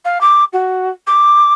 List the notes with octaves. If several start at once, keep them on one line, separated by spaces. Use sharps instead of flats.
F5
D6
F#4
D6